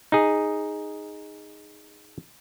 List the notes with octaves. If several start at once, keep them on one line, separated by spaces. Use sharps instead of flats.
D#4 G#4